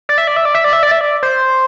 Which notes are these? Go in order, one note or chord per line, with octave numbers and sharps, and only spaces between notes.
D5
E5
D5
E5
D5
E5
D5
E5
D5
E5
D5
C5